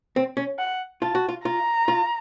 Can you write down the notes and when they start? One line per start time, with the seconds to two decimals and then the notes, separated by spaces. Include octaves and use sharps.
0.16 C4
0.37 C#4
0.59 F#5
1.02 F4 A5
1.15 F#4
1.29 F4
1.45 F4 A#5
1.88 F4